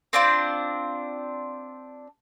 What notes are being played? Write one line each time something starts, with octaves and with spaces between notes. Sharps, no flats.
C4 D4 F4 C5